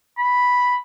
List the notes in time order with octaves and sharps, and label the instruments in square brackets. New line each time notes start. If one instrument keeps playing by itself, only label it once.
[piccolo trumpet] B5